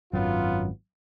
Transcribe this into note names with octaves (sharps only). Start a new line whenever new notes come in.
G#1 F#2 F#3 B3 F4